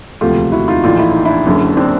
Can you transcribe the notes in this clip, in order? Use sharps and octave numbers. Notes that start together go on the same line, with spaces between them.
E1 D2 C3 F3 A3 F4 G4
E4 F#4
D#4 F4
A#1 A2 E3 D#4 F4
E4
D#4
D4 E4
F#1 F#2 D3
C4 D4